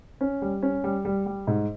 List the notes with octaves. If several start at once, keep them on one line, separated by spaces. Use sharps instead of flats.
C#4
G3
C#4
G3
G3
G3
G#2